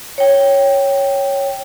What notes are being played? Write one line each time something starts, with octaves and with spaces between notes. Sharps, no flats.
C#5 G5